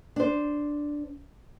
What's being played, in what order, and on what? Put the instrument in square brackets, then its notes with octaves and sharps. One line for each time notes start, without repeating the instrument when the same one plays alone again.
[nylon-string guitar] D4 C5